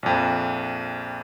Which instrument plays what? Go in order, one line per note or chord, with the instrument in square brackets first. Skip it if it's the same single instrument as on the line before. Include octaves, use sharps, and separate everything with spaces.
[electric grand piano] A#1 F2